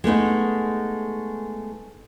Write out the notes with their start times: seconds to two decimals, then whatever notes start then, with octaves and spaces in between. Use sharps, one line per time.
0.04 G#3 A3 B3 D#4